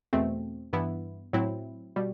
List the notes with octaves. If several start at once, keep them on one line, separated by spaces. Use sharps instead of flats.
E2 B2 A3 C4
G2 E3 B3 E4
A2 F#3 C4 E4
B2 G3